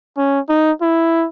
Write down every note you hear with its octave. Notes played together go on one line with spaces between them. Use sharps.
C#4
D#4
E4